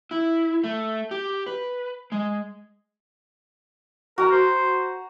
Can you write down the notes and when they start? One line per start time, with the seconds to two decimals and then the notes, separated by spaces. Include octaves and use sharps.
0.11 E4
0.64 A3
1.11 G4
1.46 B4
2.12 G#3
4.18 F#4 A#4 A#5
4.31 C5